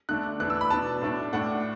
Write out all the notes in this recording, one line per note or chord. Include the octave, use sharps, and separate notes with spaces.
D3 A3 D4 F#6
E3 A3 D4 F#6
E6
B5
B2 B3 D4 A5
A2 A3 D4
A2 A3 D4 F#5